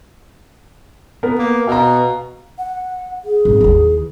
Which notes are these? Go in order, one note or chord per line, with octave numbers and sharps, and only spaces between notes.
B3 A#4
A#3
B2 F5 A#5
F#5
G#4
G#1
D#2 E3